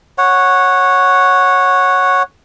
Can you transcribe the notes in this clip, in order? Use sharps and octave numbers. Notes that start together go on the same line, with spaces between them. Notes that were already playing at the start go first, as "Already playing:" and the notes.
C#5 F#5